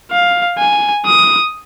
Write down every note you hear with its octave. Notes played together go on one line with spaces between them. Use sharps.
F5
G#5
D#6